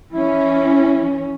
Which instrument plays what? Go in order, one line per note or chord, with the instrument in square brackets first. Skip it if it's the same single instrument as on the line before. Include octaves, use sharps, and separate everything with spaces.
[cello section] E3 C#4 [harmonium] E4